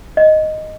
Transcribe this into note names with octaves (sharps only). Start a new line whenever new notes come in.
D#5